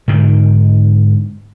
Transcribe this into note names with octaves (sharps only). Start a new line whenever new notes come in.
G#2 D3 D#3